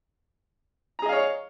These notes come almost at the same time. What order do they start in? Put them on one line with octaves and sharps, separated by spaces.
A#5 G#4 D#5 F5 C#5